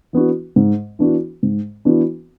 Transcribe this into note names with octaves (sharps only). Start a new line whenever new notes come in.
E3 B3 D4 F#4
G#2
E3 B3 D4 F#4
G#2
E3 B3 D4 F#4